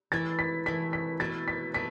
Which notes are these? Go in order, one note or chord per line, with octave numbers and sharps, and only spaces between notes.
E3 A3 E4 A6
B6
E3 A3 E4 B6
B6
B2 A3 E4 A6
B6
B2 A3 E4 B6